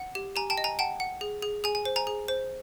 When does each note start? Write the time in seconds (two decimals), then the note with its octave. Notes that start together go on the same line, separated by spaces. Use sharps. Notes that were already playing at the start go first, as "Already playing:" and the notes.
Already playing: F#5
0.15 G4
0.36 G4 G#5 A#5
0.50 G5 A5
0.58 D#5
0.64 G#5 A#5
0.79 F#5 G5 A5
1.00 F#5
1.21 G#4
1.42 G#4
1.64 G#4 G#5
1.75 G#5
1.85 C5
1.96 G#5 A#5
2.07 G#4
2.28 C5